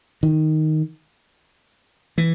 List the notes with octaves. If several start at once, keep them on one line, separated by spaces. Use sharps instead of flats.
D#3
E3